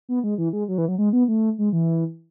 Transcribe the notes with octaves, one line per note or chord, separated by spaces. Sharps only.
B3
G#3
E3
G#3
F#3
E3
F#3
G#3
B3
A3
G#3
E3